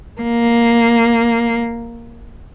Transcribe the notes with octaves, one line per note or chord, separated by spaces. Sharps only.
A#3